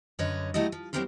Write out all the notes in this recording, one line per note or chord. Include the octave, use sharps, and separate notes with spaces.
F#2 D3 B4 C#5 D#5
F#3 A3 E4 G4 D#5
F3
F#3 C4 E4 G4 A#4 C5